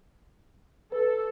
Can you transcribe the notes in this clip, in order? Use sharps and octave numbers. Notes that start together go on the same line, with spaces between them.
A4 B4